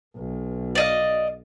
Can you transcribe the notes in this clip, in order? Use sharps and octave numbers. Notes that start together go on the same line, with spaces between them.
B1
D5 D#5 F5